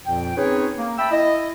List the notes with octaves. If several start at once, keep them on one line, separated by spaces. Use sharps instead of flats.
F2 A#2 F3 G5
C4 C#4 D#4 G#4 B4 C#5
A#3
E5 G5 A5 B5 E6
E4 D#5